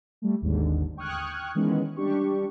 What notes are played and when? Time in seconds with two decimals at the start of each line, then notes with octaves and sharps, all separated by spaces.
0.22 G3 A3
0.41 G#1 D#2 G#2 D3
0.97 G5 C#6 D#6 F6 F#6 G#6
1.55 D#3 E3 G#3 B3 C#4
1.97 G3 D4 G4 C#6